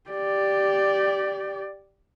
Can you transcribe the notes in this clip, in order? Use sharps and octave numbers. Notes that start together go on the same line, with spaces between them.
G4 D5